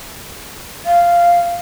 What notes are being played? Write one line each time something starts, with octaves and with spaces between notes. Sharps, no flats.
F5